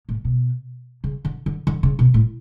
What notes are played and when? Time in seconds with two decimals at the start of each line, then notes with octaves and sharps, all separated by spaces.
0.09 A2
0.25 B2
1.04 C#3
1.25 D3
1.46 D3
1.67 D3
1.83 C#3
1.99 B2
2.14 A2